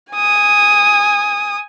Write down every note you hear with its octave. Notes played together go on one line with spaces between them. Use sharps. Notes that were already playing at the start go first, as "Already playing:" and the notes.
G#5 D#6